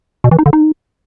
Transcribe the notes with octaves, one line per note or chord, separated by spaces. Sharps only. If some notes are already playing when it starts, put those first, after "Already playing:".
B2
E3
D#4
D3
D#4